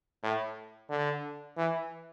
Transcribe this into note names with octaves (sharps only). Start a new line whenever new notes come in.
A2
D3
E3